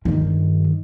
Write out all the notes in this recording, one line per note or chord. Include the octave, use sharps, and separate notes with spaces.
G2 D#3